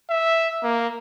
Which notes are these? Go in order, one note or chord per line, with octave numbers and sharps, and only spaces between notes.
E5
A#3